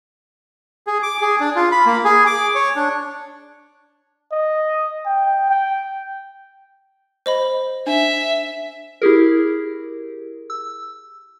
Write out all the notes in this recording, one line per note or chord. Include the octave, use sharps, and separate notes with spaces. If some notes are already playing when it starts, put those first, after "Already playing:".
G#4
D6
G#4
D4
F4
B5
A#3
G#4
D6
C#5
D4
D#5
G5
G5
C5 D#5 B5
D4 E5
E4 G4 G#4 A#4
E6